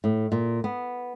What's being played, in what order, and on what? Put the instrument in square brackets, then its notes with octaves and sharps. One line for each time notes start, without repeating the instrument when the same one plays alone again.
[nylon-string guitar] A2
A#2
B3